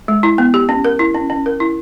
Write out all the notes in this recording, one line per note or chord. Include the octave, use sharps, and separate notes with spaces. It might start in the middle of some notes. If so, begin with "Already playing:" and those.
G#3
E4
B3
G4
C#4
A#4
E4
C#4
C#4
A#4
E4